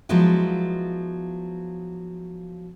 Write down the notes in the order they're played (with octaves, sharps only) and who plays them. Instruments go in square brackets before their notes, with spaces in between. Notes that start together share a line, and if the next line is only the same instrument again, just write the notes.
[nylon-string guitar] F3 F#3 G#3 B3 E4 F4